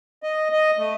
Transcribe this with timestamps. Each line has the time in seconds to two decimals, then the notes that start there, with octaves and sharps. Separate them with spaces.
0.23 D#5
0.52 D#5
0.77 A3